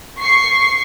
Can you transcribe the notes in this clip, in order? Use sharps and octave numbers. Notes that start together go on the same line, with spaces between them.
C#6 C7